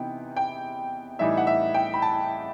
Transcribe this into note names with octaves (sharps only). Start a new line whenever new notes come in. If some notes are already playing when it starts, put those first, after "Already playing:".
Already playing: C3 E3 B3 D#4 G5
G5
A2 E3 G3 D#4 E5
F#5
E5
G5
B5
A5